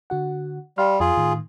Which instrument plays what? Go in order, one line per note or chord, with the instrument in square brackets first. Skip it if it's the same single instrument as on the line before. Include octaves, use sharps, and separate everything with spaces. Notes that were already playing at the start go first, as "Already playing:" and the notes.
[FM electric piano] D3 F#4 F#5
[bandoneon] G3 [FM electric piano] F5 C6 F6
[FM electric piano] F2 [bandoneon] F4 G#4
[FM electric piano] A2 D#3